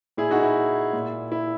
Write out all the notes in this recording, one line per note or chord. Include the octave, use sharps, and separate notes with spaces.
A#2 E4 G#4
D#4 F#4
E4
A#2
E4